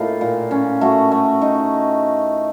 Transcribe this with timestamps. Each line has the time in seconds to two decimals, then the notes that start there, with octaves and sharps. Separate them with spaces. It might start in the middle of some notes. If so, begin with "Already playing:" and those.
Already playing: A2 A#3 D#4 F4
0.21 A#2
0.51 C#4
0.81 A3 F#4
1.12 A3
1.42 D#4